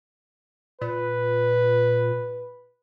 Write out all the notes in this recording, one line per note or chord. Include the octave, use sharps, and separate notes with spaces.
A#2 B4